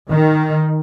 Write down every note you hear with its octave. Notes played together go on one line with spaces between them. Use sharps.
D#3